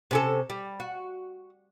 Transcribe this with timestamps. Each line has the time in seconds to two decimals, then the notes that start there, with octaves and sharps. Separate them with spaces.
0.11 C3 C#4 A4
0.50 G3
0.80 F#4